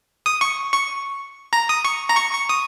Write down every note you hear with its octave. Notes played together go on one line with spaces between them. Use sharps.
D#6
C#6
C#6
A#5
D#6
C#6
A#5
C#6
C#6
D#6